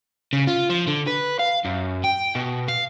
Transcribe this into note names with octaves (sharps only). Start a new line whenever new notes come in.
C#3
F4
F3
D3
B4
F5
F#2
G5
B2
F5